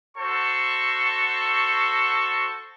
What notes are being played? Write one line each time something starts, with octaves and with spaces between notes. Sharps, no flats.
F#4 A4 C5 C#6